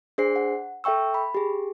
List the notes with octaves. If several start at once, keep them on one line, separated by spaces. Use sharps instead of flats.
D4 G#4 C5 C7
F#5
A4 E5 G5 C#6 E6
B5
G4 G#4